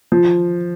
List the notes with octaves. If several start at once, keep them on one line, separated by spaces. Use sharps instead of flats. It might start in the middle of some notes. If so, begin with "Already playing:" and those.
F3